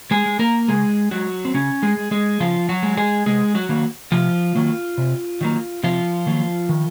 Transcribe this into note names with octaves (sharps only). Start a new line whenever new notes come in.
G#3 G#4
G#3
A#3 A#4
C#3 G#3 G#4
F#3 G#3 F#4
C4
C#3 C#4
G#3 G#4
G#3
G#3 G#4
C#3 F3 F4
F#3 F#4
G#3
G#3 G#4
C3 G#3 G#4
F#3 F#4
D#3 F#3 A#3
C3 F3 F4
D#3 F#3 A#3
C3
D#3 F#3 A#3
C3 F3 F4
D#3 F#3 A#3
D#3